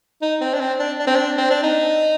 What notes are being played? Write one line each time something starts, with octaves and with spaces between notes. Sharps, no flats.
D#4
C4
D4
C4
D4
D4
C4
D4
C4
D4
D#4